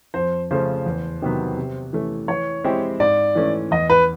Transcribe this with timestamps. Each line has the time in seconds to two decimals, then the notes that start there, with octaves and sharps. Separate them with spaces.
0.14 F2 C5
0.51 C#3 F3 A3 C5
0.86 E2
1.22 C3 D#3 F#3 B3
1.57 C3
1.93 E3 A3 C#4
2.28 E3 C#5
2.64 G#3 C4 E4 G4
3.00 G#2 D5
3.35 E3 A3 C#4
3.71 E2 D#5
3.90 B4